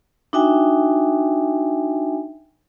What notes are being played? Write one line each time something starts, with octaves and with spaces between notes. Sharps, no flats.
D4 D#4 F#4 E5 G5 G#5